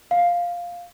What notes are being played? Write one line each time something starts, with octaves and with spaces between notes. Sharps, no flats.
F5